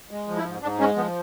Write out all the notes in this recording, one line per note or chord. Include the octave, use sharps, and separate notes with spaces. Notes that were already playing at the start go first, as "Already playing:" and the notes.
G#3
F3
E4
G#2
G#2 D4
G#3 C#4
F3 B3